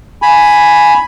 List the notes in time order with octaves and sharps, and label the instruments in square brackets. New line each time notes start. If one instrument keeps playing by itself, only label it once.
[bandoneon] G#5 B5